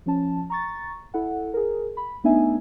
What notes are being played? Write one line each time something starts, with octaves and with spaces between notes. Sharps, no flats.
F3 C#4 A5
A#5 C#6 A6
E4 A4 F#5
G#4 A#4
B5
A3 B3 D4 D#4 E5 G#5